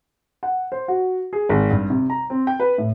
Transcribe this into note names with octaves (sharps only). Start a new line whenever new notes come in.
F#5
C5
F#4
G#4
G#1
G2
C3
A#5
C4
G5
B4
A2